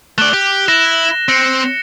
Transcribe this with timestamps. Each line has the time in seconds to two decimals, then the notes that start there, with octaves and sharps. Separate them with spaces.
0.18 A3 D5 F#6 G7
0.33 G4
0.68 E4 A#6 E7
1.29 C4 A#6 C#7